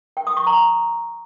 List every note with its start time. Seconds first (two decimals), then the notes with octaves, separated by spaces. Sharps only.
0.17 G5
0.27 D#6
0.37 C#6
0.47 A#5